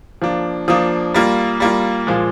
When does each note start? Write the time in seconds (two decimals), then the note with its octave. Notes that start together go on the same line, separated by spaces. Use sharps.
0.22 F3 A#3 D4
0.68 F3 A#3 D4 D#6
1.14 G3 A#3 F4
1.60 G3 A#3 F4
2.07 A#2 F3 G#3